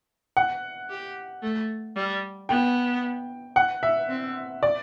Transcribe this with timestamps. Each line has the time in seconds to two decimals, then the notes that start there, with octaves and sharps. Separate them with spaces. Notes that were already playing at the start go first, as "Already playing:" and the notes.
0.37 F#5
0.90 G4
1.43 A3
1.96 G3
2.49 B3 G5
3.56 F#5
3.83 E5
4.09 C4
4.63 D5